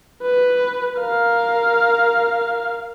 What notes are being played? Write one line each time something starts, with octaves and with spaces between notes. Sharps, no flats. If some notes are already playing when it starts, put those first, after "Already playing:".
B4
A#4 F5